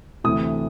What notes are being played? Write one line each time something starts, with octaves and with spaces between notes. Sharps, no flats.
D2 C3 E3 A3 D#6